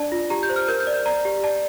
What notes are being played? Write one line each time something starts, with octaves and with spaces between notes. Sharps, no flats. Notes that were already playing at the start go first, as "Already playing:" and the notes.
Already playing: D4 D5 A5
F4
G4 A#5
G6
C5
F6
A#4 G6
G6
D5
G6
D5 A#5
G4
D5 A5